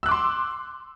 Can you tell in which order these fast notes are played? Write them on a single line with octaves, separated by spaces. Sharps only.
E6 F#6 D6 C6